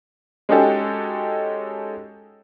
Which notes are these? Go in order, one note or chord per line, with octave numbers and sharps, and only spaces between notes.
G#3 C#4 D#4 F#4 G4 A4